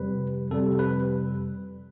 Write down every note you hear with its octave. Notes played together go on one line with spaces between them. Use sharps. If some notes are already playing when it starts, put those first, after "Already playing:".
Already playing: F2 C3 G3 B4
F2 C3 G3 A4
B4